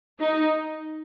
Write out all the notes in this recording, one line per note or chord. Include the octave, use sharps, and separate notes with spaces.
D#4